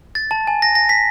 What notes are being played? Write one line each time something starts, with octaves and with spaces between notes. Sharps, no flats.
A6
A5
G#5
A#6
A#6
B6